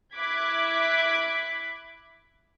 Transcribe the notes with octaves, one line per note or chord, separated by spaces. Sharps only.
E4 D6 F#6 G#6 B6